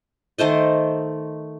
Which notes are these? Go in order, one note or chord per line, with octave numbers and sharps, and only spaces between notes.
D#3 A3 C5 D#5